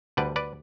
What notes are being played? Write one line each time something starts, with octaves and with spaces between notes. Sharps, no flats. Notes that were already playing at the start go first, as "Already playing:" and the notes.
D2 D3 G3 B4 D5
B4 D5